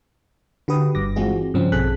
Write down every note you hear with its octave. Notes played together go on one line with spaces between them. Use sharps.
D3 F#4 G4 B4 D#6
G1 G2 D6 A#6
E3 G#3 C4 F4 F#4 G#4
G2 C#3 F3 C4 C#4
A#1 B2 G#4 A4 F#6 B6